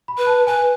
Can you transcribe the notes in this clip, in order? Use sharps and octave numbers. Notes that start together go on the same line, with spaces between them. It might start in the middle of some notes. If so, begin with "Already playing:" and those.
B5
B4
A5
B4 G#5